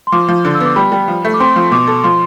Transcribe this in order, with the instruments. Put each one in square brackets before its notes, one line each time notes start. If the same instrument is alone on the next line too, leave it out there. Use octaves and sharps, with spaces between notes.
[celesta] C6
[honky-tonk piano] F3 [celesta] D6
[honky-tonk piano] F3
D3
[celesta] E6
[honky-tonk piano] B3
[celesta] D6
[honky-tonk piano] G3 [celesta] B5
[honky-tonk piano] G3
F3
A3
[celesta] D6
[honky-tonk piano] C4 [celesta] C6
[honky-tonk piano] F3
[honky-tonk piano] B2 [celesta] D6
[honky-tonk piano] A4
[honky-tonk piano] F3 [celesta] C6